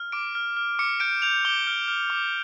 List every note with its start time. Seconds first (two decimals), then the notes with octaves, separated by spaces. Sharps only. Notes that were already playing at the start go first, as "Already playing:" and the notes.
Already playing: F6
0.12 D6 D7
0.35 F6
0.57 F6
0.79 D6 C#7
1.00 G6 D7
1.22 G6 F7
1.45 D6 G7
1.67 F6
1.88 F6
2.10 D6